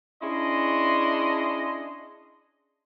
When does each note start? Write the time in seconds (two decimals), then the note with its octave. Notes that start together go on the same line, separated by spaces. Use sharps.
0.23 C#4 D4 E4 G#4 D#5 C6